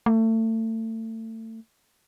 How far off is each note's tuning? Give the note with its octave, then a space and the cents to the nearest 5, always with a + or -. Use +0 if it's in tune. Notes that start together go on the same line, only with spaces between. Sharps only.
A3 +30